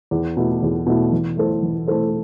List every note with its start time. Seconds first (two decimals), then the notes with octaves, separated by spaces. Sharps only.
0.11 E2
0.37 B2 A3 E4
0.63 E2
0.86 B2 A3 E4
1.12 E3
1.37 A3 E4 A4 C5
1.62 E3
1.88 A3 E4 A4 C5